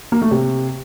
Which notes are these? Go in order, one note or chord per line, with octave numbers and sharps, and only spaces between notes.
A#3
A3
C3